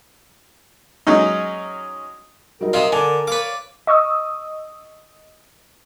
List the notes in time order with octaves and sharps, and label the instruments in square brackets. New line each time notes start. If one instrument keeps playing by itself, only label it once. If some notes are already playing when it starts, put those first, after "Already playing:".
[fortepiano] F#3 G#3 C#4 D#4
[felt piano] F#3 G3 D#4 [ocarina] A#4
[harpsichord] C3 C4 [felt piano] D#5 [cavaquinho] F5 C6 D#6
[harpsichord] D3 [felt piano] G#5 A5 [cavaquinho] D6
[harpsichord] B4 D6 [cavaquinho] C#5 D5 F5
[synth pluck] D#5 C#6 D#6 E6